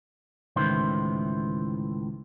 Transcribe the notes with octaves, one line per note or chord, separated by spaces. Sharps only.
C#2 A2 D#3 E3 C5